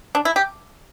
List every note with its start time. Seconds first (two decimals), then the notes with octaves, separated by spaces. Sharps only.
0.15 D4
0.25 E4
0.36 G4